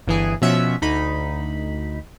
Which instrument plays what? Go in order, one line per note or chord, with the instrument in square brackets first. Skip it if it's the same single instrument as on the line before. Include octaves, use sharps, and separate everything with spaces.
[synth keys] G1 E3 G#4
B2 F3 C#4 E5 F#5
D2 D#4 B5